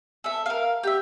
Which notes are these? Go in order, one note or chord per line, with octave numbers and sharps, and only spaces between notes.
A4 E5
A#4 F5
G4 E5